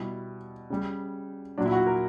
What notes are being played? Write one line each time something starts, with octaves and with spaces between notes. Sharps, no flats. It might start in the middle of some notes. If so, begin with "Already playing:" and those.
Already playing: B2 G3 E4
C#3 G3
A#2 F#3 D4
E4
F#4
A#4